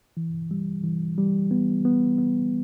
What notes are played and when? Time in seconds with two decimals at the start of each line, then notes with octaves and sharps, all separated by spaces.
0.17 E3
0.51 G3
0.84 E3
1.18 G3
1.51 B3
1.85 B3
2.18 B3